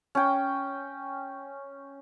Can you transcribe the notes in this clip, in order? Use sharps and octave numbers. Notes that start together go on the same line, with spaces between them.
C#4 G5